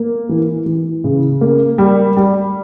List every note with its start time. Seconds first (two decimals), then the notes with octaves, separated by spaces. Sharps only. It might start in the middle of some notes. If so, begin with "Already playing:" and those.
Already playing: A#3
0.29 E3
0.66 E3
1.04 C#3
1.41 A#3
1.78 G3
2.17 G3